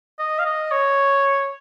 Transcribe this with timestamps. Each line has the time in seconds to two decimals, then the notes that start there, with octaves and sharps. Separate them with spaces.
0.19 D#5
0.39 F5
0.46 D#5
0.71 C#5